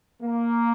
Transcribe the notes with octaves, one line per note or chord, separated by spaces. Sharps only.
A#3